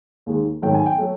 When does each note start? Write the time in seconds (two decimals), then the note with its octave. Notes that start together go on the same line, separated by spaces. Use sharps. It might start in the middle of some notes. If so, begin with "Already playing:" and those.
0.26 D#2 D#3 G#3
0.62 G#2 D#3 F#3 A3 G5
0.74 G#5
0.86 G5
0.98 F#3 A3